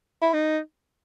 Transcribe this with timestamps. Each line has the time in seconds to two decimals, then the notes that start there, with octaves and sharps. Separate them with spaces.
0.22 E4
0.34 D#4